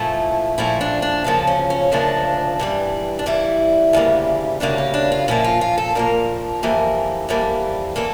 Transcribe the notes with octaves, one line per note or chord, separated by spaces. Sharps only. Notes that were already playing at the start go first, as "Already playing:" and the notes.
Already playing: A#2 F3 A3 E4
A#2 F3 A3 E4
D4
D4
D2 C#3 F3 A#3 A4
C#4
C#4
D2 C#3 F3 A#3 D4
G2 E3 G3
D4
G2 E3 G3 E4
D2 C#3 G3 A#3
D2 C#3 G3 A#3 D4
C#4
D4
F4
A#2 F3 A#3 E4
F4
F4
A4
A#2 F3 A#3 A#4
F2 E3 G3 A#3
F2 E3 G3 A#3
E3 A#3 A4